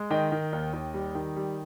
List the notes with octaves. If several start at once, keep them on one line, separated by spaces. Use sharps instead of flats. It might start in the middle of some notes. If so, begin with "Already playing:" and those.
Already playing: G#3
D#3 D#5 G5
D#3
D#2
D#2
G3
D#3
G3